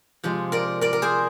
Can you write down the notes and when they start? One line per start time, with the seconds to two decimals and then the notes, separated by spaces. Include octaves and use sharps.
0.24 C3 F3 G#3
0.52 A#4 D5
0.81 A#4 D5
0.93 A#4
1.02 G#4 C5